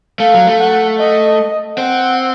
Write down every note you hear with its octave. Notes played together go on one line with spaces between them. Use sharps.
A3 F5
F#3
A3
F#5
D#5
C4 F#5